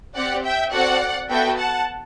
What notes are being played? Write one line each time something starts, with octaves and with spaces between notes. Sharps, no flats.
C4 G4 D5 F#5
E5 G5
C4 F#4 A4 D5 F#5
B3 F#4 A4 E5 G5
F#5 A5